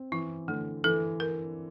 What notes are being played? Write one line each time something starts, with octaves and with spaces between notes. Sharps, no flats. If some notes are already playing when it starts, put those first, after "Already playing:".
Already playing: C4
E3 E4
D3 A3
E3 A4
A#4